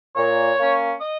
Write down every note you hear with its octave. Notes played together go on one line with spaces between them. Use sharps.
A#2 C#5
A#3 C#4
D#5